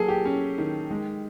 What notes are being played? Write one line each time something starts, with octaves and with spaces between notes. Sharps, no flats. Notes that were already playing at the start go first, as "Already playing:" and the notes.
Already playing: F#3 A#3 G#4 A4
G4
C#4
D#3
G#3